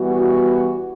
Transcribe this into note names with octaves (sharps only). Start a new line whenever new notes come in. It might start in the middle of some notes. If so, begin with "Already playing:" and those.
Already playing: E3 G3 B3 F#4